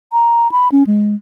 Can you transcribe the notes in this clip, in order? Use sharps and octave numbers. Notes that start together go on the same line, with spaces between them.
A#5
B5
C#4
G#3